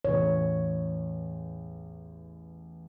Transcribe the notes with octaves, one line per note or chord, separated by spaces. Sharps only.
A1 E2 C#5